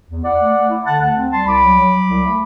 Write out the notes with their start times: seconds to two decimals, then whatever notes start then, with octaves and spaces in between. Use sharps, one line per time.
0.09 E2
0.24 E4 D5 F#5
0.40 A3
0.54 A3
0.70 E4
0.85 D3 F#5 A5
1.01 D2 F#5 A5
1.16 C4
1.31 G3 A5 C6
1.46 C2 B5 D6
1.62 F#3
1.78 F#3
1.92 F#3
2.08 C2
2.24 A3